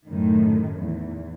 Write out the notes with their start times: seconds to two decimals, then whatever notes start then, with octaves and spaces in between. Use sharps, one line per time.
0.10 F#2 A2 D#3
0.78 E2